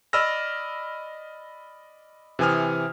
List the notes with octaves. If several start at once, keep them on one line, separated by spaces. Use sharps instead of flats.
D5 D#5 B5 E6 F6 A#6
C3 E3 G#5 D#6 F6